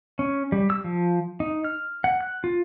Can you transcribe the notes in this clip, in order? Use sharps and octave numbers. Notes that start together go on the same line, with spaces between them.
C#4
G3
E6
F3
D#4
F6
F#5
F#6
F4